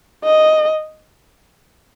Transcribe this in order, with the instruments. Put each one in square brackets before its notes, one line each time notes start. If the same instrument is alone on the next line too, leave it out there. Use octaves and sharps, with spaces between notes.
[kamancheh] D#5